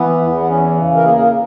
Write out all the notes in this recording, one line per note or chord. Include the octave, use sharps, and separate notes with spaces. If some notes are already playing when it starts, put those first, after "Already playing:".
Already playing: E3 B3
E2
B3
E3 C#4
C#3
A#4
A#3 G#4
G#4
A#4